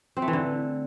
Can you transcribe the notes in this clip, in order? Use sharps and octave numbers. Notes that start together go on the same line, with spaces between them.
C4
A3
E3
D3